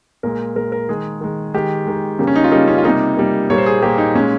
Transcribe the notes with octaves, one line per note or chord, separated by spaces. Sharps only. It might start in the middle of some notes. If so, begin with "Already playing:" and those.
A#2 G#3 A#4
A#2 G#3 A#4
A#4
D#3 G#3 G#4
D#3 G#3
D#3 G#3 G4
D#3 G#3
C#3 G3 A#3
C#4
D#4
F4
C#3 G3 A#3 D#4
C#4
F4
C3 G3 A#3 D#4
C3 G3 A#3
A#2 G3 A#3 C#5
C5
G#4
A#2 G3 A#3 G4
D#4
A#2 G#3 C#4